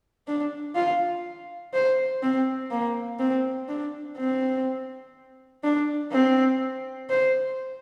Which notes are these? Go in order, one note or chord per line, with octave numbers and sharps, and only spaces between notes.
D4
F4
C5
C4
A#3
C4
D4
C4
D4
C4
C5